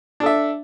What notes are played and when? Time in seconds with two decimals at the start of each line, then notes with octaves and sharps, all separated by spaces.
0.20 D4
0.23 A4
0.26 E5